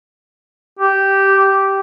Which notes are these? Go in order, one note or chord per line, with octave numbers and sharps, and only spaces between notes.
G4